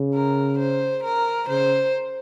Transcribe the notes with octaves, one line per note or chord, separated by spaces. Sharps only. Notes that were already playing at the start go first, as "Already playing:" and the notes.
Already playing: C#3
A#4
C5
A#4
C#3 C5